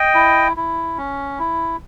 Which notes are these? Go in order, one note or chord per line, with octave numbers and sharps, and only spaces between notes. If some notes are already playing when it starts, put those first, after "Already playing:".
Already playing: D#5 G5
E4
E4
C#4
E4